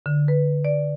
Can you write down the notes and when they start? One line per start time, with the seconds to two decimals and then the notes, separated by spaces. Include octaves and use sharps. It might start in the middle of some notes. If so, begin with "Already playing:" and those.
0.06 D3
0.28 B4
0.65 D5